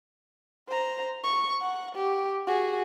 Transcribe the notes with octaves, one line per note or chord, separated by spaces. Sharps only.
C5 A#5
C#6
F#5
G4
F#4 G#4